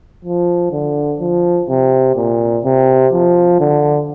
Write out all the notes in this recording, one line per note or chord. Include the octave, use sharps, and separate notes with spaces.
F3
D3
F3
C3
A#2
C3
F3
D3